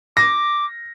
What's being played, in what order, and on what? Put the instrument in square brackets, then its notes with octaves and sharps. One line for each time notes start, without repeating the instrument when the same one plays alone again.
[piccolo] D6 [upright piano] A#6